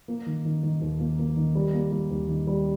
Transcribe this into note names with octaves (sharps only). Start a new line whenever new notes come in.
A#3
D#3
D#3
D#3
D#2
A#3
A#3
D#3
G3
A#3
G3
D#2
D#3
G3